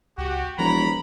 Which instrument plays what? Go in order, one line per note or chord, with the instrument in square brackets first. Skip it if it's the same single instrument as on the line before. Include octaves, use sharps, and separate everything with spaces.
[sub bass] C#2 [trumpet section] F#4 G4
[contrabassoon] E1 [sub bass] F3 [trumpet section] A#4 C#5 A#5 [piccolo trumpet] B5